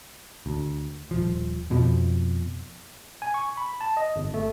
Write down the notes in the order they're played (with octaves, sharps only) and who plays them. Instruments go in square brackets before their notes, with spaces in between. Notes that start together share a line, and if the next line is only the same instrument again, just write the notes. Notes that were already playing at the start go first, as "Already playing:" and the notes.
[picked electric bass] D2
D#1 F3
F2 B2 F3
[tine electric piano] G#5
C#6
B5
A5
D#5
G1
A3